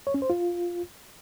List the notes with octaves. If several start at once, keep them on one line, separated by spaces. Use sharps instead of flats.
C#5
C#4
C5
F4